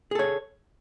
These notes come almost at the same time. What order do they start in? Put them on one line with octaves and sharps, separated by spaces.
G#4 A4 C#5